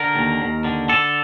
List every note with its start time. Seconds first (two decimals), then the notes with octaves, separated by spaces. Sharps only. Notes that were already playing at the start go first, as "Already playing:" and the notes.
Already playing: D3 A#4
0.15 D#2
0.41 D#2
0.64 D3
0.89 D3 A4